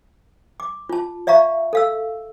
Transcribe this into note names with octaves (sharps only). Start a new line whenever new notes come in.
D6
F4 A5
D5 E5 F5 A#5 C#6
A4 F5 E6